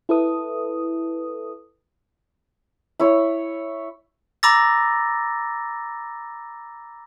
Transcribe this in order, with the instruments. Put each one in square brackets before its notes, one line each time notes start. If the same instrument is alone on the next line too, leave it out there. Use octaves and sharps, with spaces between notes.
[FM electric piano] E4 A4 B4 D#6
[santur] E4 C#5
[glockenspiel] A#5 B5 D6 E6 A6 A#6